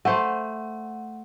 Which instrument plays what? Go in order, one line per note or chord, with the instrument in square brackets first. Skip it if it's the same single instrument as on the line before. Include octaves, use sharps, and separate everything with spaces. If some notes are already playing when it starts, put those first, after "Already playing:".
[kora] A3 C5 [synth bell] F#5